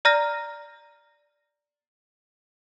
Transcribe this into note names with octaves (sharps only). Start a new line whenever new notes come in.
D5 A#5 F6 A#6